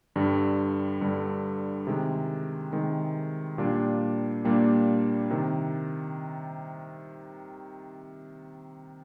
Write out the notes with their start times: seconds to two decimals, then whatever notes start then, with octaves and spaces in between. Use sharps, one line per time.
0.16 G2 D3 G3
1.01 G2 D3 G3
1.87 C3 D#3 G#3
2.73 C3 D#3 G#3
3.58 A#2 G3 A#3 D4 G4
4.45 A#2 G3 A#3 D4 G4
5.30 C3 D#3